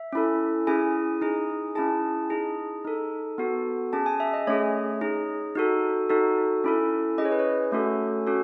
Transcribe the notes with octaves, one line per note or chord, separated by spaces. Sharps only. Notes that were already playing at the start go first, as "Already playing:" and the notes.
Already playing: E5
C#4 E4 A4
C#4 E4 G#4 G#5
D#4 G#4
C#4 E4 G#4 A5
D#4 G#4
D#4 A4
B3 F#4 A4
C#4 G#4 A5
G#5
E5
D#5
A3 C#4 G#4 C#5
D#4 G#4
D#4 F#4 A4
D#4 F#4 A4
C#4 E4 A4
C#4 G#4 D#5
C#5
B4
C#5
A3 C#4 F#4 A4
C#4 F#4 A4